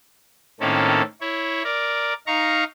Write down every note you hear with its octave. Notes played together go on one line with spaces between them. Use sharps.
A2 D#3 A#3 C4 C#4 A4
E4 C#5
A#4 D5
D#4 F5 A#5 C#6